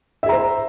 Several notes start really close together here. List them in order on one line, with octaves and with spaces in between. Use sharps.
E5 G#4 A#5 C5